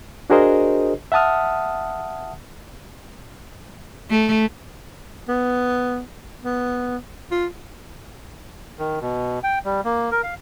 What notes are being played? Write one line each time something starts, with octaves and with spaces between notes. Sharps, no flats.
D4 F#4 G#4 A#4 C5 D#5
E5 F#5 A5 D#6 F6
A3
B3
B3
F4
D#3
B2
G5
G3
A#3
A#4
F5